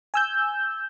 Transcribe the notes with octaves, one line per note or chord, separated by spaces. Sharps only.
G#5 E6 G6